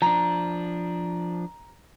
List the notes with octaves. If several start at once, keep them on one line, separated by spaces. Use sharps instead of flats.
F3 D4 A#5